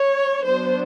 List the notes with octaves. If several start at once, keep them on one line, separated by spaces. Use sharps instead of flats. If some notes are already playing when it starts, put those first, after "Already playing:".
Already playing: C#5
F#3 B3 D4 C5